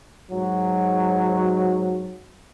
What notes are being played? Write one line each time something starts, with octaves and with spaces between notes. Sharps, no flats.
G#2 F#3